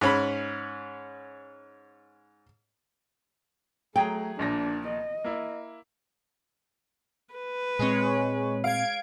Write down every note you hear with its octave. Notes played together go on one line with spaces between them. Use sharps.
G#2 C#4 B5
F#3 A3 G#4 G5 A#5
A#1 A#2 D4 A#6
D#5
A#3 E4
B4
A#2 G#3 C4 C#5
F5 G#6 D7